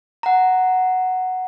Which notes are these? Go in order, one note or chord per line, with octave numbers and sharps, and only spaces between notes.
F#5 A#5